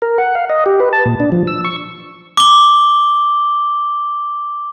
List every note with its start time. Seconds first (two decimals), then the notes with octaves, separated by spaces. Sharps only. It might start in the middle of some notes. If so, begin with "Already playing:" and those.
0.02 A#4
0.18 F#5
0.35 F5
0.50 D#5
0.66 G4
0.80 B4
0.93 A5
1.05 A#2
1.20 D4
1.32 F3
1.47 E6
1.64 C#6
2.37 D6 G7